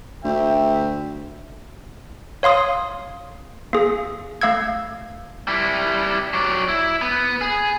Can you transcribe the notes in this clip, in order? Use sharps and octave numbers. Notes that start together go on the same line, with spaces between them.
D2 E5 G5
C#5 F5 C6 D#6
A#3 G#4
A3 F5 E6 G#6
G3 E4
F#3 D5
E4
B3
G#4